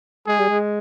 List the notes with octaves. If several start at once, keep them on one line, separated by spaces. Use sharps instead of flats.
G#3 G#4
G3
G#3